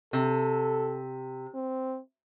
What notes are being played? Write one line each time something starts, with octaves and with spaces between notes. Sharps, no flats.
C3 A4
C4